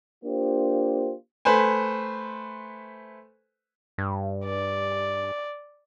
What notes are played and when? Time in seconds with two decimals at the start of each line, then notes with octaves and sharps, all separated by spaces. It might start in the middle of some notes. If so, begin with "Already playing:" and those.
0.24 A#3 D4 F4 G4 C5
1.45 A3 B4 C5 G#5
3.98 G2
4.45 D5